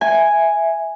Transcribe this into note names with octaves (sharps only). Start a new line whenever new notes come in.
E5 G#5